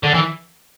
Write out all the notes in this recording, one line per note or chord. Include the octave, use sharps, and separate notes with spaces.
D3
E3